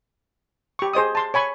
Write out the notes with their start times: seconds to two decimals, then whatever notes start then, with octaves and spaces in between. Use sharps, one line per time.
0.79 G4 C#6
0.93 G#4 C5 D#5 D#6
1.15 A5 C6
1.34 C#5 G#5 B5 C#6